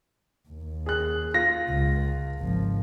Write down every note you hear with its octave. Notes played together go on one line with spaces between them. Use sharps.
D#2
G#4 F#6
F4 A#6
C#2
G#1 F3